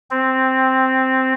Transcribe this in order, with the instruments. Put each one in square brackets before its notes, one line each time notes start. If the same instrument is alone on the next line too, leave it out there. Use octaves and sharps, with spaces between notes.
[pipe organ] C4